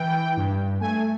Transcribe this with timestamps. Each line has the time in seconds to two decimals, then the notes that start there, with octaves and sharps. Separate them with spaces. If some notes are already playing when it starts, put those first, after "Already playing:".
Already playing: E3 G5
0.37 G2
0.81 A3 G#5